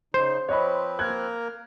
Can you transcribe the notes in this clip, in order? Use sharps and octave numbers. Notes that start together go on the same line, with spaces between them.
C#3 D#4 C5
F3 C4 B4 C#5 D#5 B5
A#3 A#4 F#6 G#6